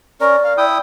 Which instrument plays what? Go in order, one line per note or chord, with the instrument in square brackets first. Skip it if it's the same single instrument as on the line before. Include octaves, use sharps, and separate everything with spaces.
[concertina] C#4 A#4 [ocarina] D5
[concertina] F5
E4 G5 D#6